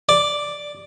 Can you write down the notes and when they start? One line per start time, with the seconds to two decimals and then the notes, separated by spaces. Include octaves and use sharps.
0.09 D5